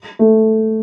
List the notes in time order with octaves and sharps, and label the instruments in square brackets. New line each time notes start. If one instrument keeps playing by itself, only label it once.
[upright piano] A3